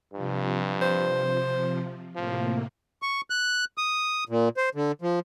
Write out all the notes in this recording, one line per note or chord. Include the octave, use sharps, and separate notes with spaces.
G2 C3 F3
C5
A2 C3 F3 A#3
C#6
F#6
D#6
A#2
C5
D3
F3